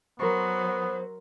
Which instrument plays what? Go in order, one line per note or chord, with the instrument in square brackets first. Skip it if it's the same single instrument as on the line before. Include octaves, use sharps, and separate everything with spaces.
[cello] F#3 [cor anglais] B3 [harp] A#4 C6 C#6 [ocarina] C5